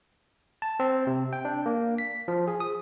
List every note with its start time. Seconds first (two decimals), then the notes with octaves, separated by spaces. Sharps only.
0.62 A5
0.80 C4
1.07 C3
1.33 G5
1.45 D4
1.66 A#3
1.98 B6
2.28 F3
2.48 G#4
2.60 D#6